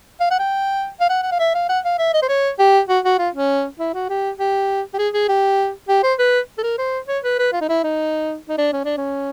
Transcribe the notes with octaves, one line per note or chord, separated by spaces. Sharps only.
F5
F#5
G5
F5
F#5
F#5
F5
E5
F5
F#5
F5
E5
D#5
C5
C#5
G4
F#4
F#4
F4
C#4
E4
F#4
G4
G4
G4
G#4
G#4
G4
G4
C5
B4
A4
A#4
C5
C#5
B4
B4
F4
D#4
E4
D#4
D#4
D4
C#4
D4
C#4